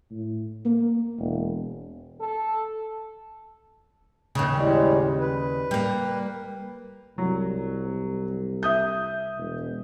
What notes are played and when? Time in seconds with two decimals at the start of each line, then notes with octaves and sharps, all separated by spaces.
0.11 A2
0.65 A#3
1.18 E1
2.21 A4
4.35 D#2 C#3
4.55 A2 G3 G#3
5.19 B4
5.71 G3 A#3
7.18 C2 F#3
8.63 E5 D#6 G6
9.37 E1